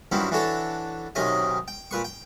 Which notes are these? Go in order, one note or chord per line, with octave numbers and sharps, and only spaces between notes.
G2 D#3 F#3 C4 C#4 E4
E3 D4 F#4 A4 C#5
B1 C3 D#3 C#4 D#5 G#5
G5
A#2 B4 C#6
G5